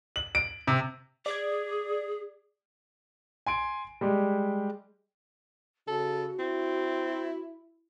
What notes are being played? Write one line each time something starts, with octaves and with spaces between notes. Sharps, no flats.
F#7
D7
C3
G#4 D5 G#6
G#5 C6 D7
G3 G#3 G4
C#3 F#4 A4
C4 E4